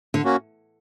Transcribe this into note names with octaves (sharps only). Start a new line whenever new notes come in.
D3
A#3 C#4 F#4